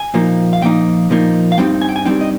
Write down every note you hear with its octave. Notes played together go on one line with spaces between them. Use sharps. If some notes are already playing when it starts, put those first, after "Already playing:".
Already playing: G#5
A#2 F3 A#3 D#4
F5
A#2 F3 A#3 D#4 G5
A#2 F3 A#3 D#4
F5
G2 G3 C4 D#4 G5
G#5
G5
G#5
G2 G3 C4 D#4 G5
D#5